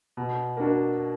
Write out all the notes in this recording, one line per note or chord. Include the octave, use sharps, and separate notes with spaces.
B2
A#3 D4 F#4